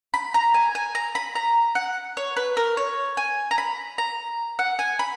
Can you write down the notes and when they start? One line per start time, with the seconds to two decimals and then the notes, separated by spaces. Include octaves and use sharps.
0.14 B5
0.34 A#5
0.54 G#5
0.75 G#5
0.95 A#5
1.15 B5
1.35 A#5
1.75 F#5
2.17 C#5
2.36 B4
2.57 A#4
2.77 C#5
3.17 G#5
3.51 A#5
3.58 B5
3.98 A#5
4.59 F#5
4.79 G#5
4.99 B5